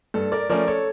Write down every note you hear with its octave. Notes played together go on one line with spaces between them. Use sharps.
G2 A4
A#4 D5
F3 A3 C#4 A#4 D5
A4 C#5